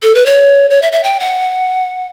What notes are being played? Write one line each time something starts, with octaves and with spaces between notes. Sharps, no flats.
A4
B4
C#5
C#5
E5
E5
G5
F#5